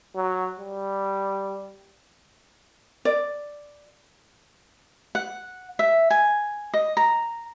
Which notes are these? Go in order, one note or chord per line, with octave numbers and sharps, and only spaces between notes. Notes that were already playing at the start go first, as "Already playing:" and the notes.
F#3
G3
D5
F#5
E5
G#5
D#5
A#5